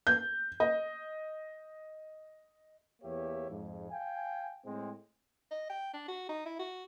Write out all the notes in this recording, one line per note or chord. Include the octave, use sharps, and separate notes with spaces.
G6
D#5
E2 A#3 G4 C#5 E5
F2 G#2
F5 G5 G#5
A2 G#3 C4
D#5
G5
D4
F#4
D#4
E4
F#4